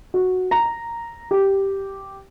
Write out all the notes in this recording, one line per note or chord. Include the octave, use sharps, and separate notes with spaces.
F#4
A#5
G4